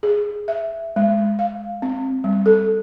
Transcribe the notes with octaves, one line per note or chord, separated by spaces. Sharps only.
G#4
E5
G#3
F5
C4
G3
A4